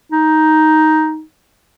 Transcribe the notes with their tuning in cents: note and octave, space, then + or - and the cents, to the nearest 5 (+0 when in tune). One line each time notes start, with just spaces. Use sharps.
D#4 +5